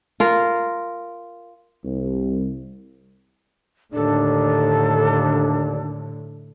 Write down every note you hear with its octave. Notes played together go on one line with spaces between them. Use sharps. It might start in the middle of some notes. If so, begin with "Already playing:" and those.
F4 A#4
C2
D#2 A2 D3 D4 A4